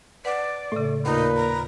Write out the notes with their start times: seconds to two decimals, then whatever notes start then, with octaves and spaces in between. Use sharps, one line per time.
0.25 B4 D5 F#5
0.72 A2 C#3 A3
1.05 D#2 A#2 D#4 B4
1.36 A#5